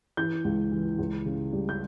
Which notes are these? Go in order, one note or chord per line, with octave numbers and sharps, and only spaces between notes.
E3 G6
C#2
E3
C#2
C#3
G3
G6